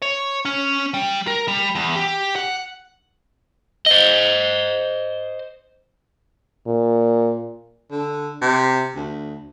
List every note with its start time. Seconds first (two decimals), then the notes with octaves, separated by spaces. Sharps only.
0.02 C#5
0.45 C#4
0.94 G3
1.27 A#4
1.48 G3
1.75 E2
1.96 G4
2.36 F#5
3.86 C5 D#5
6.67 A#2
7.91 D3
8.42 C3
8.95 D2